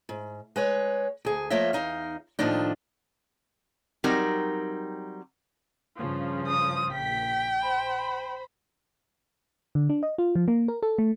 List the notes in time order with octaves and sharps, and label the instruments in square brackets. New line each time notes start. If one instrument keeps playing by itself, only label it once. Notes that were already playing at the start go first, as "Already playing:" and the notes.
[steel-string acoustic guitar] G#2
G#3 B4 C#5
D2 G#4
F3 A3 A#3 C#5 D#5 E5
E2 G2 D#4 F5
A2 D#3 F3 A#3 D4 D#4
[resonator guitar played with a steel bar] F#3 G3 C4 D#4 A#4
[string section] G2 C#3 F3
[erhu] D#6
[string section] A#1 B6 [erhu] G5
[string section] C5 B5
[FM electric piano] D3
D4
D#5
F4
F3
A#3
A#4
A4
A3